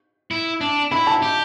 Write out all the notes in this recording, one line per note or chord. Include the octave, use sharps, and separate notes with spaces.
E4
D4
E4 B5
A5
G4